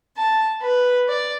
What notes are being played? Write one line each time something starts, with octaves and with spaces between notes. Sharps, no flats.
A5
B4
D5